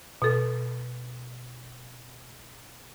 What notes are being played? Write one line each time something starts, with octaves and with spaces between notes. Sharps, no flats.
B2 A4